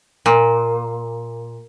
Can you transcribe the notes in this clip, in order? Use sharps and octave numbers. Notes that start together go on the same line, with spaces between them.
A#2